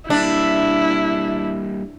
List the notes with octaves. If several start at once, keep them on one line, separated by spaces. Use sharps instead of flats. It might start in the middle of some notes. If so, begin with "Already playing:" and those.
G3 A#3 D4 E4 E5